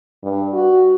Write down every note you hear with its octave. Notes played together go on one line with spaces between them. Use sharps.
G2
F#4